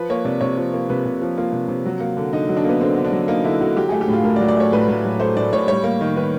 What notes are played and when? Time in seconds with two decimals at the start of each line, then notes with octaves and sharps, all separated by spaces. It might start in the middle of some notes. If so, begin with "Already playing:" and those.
Already playing: F3 B4
0.10 A#3 C#5
0.25 C3 D5
0.41 C3 C#5
0.57 F3
0.74 A#3
0.89 C3 B4
1.05 C3
1.21 F3
1.37 A#3 F4
1.52 C3
1.68 C3
1.85 F#3
2.00 A#3
2.17 D3
2.33 D3 D#4
2.49 F#3
2.57 D4
2.65 A#3 B3
2.81 D3 C4
2.96 D3
3.05 D4
3.12 F#3
3.28 A#3 D#4
3.44 D3 E4
3.61 D3 F#4
3.77 F#3 G4
3.89 A3 G#4
4.01 G4
4.08 A2
4.13 F4
4.24 A2 A#4
4.36 D5
4.40 F#3
4.48 D5
4.56 A3 C#5
4.72 A2 B4
4.88 A2
5.05 F#3
5.20 A3 C5
5.37 A2 D5
5.52 A2 C#5
5.68 G3 C#5
5.84 A#3
6.01 D#3
6.16 D#3 B4